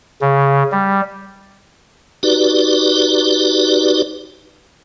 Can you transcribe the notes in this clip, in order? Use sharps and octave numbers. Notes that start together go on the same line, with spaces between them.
C#3
G3
D#4 F#4 G4 B4 D5